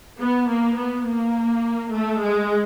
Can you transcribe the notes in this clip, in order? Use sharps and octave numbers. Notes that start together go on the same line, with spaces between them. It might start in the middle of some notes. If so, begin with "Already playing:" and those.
B3
A#3
B3
A#3
A3
G#3